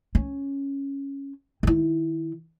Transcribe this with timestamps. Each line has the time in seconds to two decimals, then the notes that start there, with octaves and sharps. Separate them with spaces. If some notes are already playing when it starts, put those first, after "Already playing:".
0.15 C#4
1.63 D#3 E4